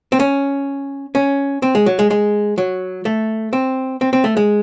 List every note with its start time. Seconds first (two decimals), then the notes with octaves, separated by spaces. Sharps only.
0.12 C4
0.20 C#4
1.15 C#4
1.62 C4
1.75 G#3
1.86 F#3
1.99 G#3
2.11 G#3
2.58 F#3
3.05 A3
3.53 C4
4.01 C4
4.13 C4
4.24 A3
4.37 G#3